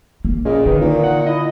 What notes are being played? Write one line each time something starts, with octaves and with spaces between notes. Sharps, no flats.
A#3
A#2 C#3 D#5
D3 D#3 B4
A#2 D#4
F#5
E4 D#5